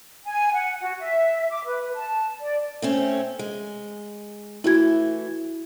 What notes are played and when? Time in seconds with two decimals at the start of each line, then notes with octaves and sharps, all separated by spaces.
0.24 G#5
0.53 F#5
0.81 F#4
0.99 E5
1.51 D6
1.66 B4
1.95 A5
2.41 D5
2.82 A3 C4 C#4
3.39 G#3
4.64 E3 A3 E4 F#4 G#6